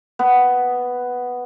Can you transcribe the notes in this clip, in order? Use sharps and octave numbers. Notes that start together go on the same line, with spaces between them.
B3